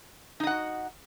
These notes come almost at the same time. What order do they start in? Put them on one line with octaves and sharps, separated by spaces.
D#4 D#5 F#5 F#4